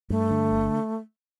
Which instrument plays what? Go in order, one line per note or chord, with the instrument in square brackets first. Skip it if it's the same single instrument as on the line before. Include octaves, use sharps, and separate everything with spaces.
[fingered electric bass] G2 [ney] A3
[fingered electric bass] D3
G1